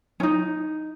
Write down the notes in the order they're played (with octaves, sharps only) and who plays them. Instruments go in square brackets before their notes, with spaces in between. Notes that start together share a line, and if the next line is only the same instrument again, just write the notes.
[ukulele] C#4 D#4